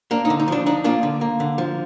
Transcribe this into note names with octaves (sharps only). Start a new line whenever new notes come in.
A#3 D4
D#4
D3
D#4
F3 D4
D4 D#4
A#3 D4 F4
D3
A#3
D3
F3